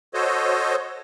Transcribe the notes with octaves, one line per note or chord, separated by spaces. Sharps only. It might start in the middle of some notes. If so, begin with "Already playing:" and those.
F#4 A4 C5 C#5 D#5